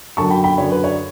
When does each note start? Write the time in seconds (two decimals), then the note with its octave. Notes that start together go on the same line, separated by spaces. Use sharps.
0.17 F#2 D3 F#3 A5 C#6
0.30 G5 B5
0.44 G5 B5
0.58 F#2 D3 F#3 C#5
0.72 B4
0.84 C#5